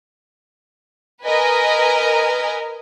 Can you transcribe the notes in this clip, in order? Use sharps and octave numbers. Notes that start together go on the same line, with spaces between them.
A#4 B4 D#5 G#5